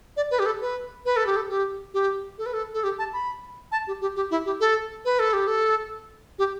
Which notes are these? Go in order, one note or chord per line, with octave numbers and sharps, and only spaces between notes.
D5
B4
G4
A4
B4
B4
A4
G4
A4
G4
G4
A4
B4
A4
A4
G4
A5
B5
A5
G4
G4
G4
E4
G4
A4
B4
A4
G4
A4
G4